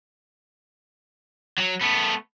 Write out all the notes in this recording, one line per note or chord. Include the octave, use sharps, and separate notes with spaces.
F#3
A3 B3